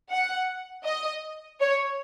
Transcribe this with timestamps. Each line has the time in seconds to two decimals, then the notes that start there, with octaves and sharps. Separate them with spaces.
0.11 F#5
0.85 D#5
1.60 C#5